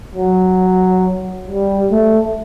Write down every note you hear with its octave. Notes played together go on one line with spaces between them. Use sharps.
F#3
G3
A3